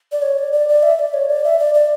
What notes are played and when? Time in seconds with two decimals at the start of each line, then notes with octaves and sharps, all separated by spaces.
0.12 D5
0.22 C#5
0.38 D5
0.53 D5
0.69 D5
0.83 E5
0.99 D5
1.14 C#5
1.29 D5
1.44 E5
1.59 D5
1.74 D5